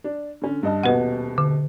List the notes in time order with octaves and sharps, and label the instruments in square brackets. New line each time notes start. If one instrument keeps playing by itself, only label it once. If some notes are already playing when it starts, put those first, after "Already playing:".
[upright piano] D4
D3 C#4
G2 D#5 A5
[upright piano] D#1 B2 D#5 [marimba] B4 F#5
[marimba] D3